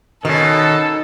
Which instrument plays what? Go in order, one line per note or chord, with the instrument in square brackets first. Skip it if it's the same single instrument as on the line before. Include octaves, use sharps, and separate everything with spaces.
[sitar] B2 [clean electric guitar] D#3 C#4 [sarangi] D#4 [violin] A4